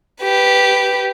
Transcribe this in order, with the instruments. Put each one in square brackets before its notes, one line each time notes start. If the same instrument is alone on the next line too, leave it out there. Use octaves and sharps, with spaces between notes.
[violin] G4 B4